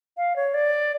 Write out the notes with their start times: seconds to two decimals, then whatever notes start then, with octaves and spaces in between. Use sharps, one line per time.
0.17 F5
0.36 C#5
0.54 D5